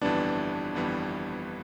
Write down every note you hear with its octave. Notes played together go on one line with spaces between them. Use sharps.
G1 F2 E3 G3 B3 D4
G1 F2 E3 G3 B3